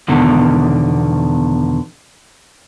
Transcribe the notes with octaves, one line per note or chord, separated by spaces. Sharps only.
E2 B2 D3 D#3